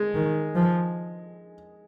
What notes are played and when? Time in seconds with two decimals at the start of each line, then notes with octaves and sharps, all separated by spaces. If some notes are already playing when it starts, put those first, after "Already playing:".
Already playing: G#3
0.15 D#3
0.55 F3